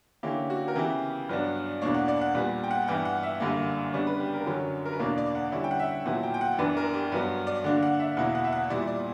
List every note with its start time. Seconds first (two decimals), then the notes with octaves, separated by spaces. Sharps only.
0.23 D3 A#3 C#4 E4 G4
0.50 F#4
0.68 A#4
0.76 C#3 E3 B3 E4 G4
1.29 G2 F#3 B3 D4
1.82 E2 B2 A#3 D4 C#5
1.94 F#5
2.08 D5
2.21 F#5
2.35 A#2 G3 B3 F#5
2.64 G5
2.71 F#5
2.88 G2 E3 B3 E4 G5
3.05 F#5
3.23 E5
3.40 F#2 D3 G3 A#3
3.93 C#3 G3 B3 D4 C#5
4.07 B4
4.20 G4
4.34 A#4
4.46 F#2 D3 F#3 C#4
4.86 A#4
4.93 B4
5.00 E2 B2 A#3 D4 C#5
5.18 D5
5.35 F#5
5.52 D3 G3 C#4 E4
5.64 G5
5.71 F#5
5.79 E5
6.06 A#2 F#3 B3 E4 F#5
6.23 G5
6.34 G5
6.41 F#5
6.58 F#2 E3 B3 D4 B4
6.77 A#4
6.94 G4
7.12 G2 F#3 B3 B4
7.47 D5
7.64 D3 A#3 D4 F#5
7.83 F#5
8.00 E5
8.17 E2 B2 A#3 E4 F#5
8.35 F#5
8.44 E5
8.52 F#5
8.70 A#2 G3 B3 E4 D5
8.87 D5